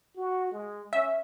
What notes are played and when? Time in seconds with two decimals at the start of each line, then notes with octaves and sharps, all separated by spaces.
0.16 F#4
0.52 G#3
0.93 C#4 E5